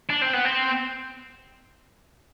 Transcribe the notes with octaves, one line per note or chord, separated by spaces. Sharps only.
D4
C4
B3
C4